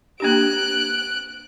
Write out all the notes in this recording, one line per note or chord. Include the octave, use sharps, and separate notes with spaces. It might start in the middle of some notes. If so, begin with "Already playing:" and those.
A#3 D4 G4 F#6 D7